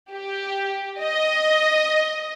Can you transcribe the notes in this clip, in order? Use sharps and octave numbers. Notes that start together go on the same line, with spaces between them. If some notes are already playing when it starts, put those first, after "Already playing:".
G4
D#5